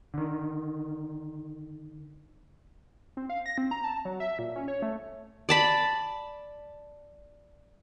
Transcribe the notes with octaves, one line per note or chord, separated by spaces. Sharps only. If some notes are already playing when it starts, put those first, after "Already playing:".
D3 D#3
C4
F5
A#6
C4
A#5
A5
F#3
E5
A#2
C#4
C#5
A3
D5 A5 B5